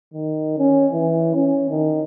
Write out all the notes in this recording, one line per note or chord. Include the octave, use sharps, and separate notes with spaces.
D#3
C#4
E3
C#4
D#3